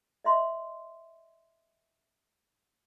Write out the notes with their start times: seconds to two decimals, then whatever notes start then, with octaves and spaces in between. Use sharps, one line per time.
0.24 D#5 E5 C6